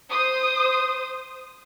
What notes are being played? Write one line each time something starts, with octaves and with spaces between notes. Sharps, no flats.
C5 D#6